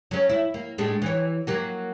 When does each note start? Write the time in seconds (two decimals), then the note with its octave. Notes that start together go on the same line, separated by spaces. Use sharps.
0.11 F#3 C#4
0.29 E4
0.54 A#3
0.78 A2 G#3 D4
1.02 E3 C#5
1.47 F#3 A#3 F#4